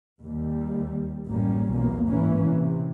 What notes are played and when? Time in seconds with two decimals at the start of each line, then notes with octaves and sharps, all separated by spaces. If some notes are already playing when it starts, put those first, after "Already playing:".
0.21 D#2 G3
1.27 A1 F#2 G3 A#3 C#4
1.72 B1 E2 A#2 A#3
2.07 A1 G#2 E3 A#3 C#4
2.48 C3